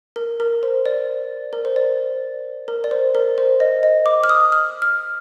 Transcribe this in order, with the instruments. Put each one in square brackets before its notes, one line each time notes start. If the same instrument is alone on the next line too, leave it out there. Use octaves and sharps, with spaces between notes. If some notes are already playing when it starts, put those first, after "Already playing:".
[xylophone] A#4
A#4
C5
D5
A#4
C5
D5
A#4
D5
C5
A#4
C5
D#5
D#5
D6
F6
D#6
F6
F6